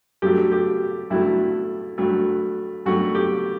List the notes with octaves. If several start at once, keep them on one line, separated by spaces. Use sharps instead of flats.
G2 F#3 A3 G4
G4
G2 F#3 A3 E4
G2 F#3 A3
G2 F#3 A3 F#4
G4